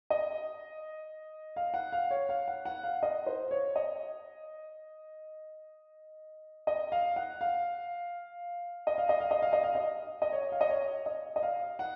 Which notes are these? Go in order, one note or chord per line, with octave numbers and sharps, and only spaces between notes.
D#5
F5
F#5
F5
C#5
F5
F#5
F#5
F5
D#5
C5
C#5
D#5
D#5
F5
F#5
F5
D#5
F5
D#5
F5
D#5
F5
D#5
F5
D#5
D#5
C#5
F5
D#5
C#5
D#5
D#5
F5
F#5